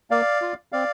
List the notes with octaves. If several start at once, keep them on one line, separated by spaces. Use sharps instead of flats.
A#3 D5 F5
F4
C4 D5 F5